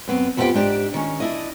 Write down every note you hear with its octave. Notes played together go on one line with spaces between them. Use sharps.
F#2 B3 C4
F2 F3 B3 C4 G4 G5
G#2 D4 G4 D5
D#3 C#4
D4 E4 D#5